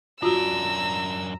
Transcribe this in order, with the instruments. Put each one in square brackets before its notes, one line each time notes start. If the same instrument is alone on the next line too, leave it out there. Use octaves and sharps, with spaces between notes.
[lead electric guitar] F#2 D4 [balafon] F4 F#4 [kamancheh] A#5 [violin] E6